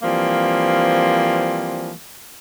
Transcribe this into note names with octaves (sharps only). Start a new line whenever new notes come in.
E3 F3 G3 A#3 C4